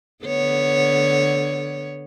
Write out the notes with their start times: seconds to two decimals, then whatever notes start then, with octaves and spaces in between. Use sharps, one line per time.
0.24 D3 B3 C#5